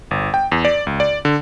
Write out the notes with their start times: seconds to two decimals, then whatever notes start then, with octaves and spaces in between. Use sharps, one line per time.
0.11 G1
0.34 G5
0.52 E2
0.65 D5
0.87 C#2
1.00 D5
1.25 D3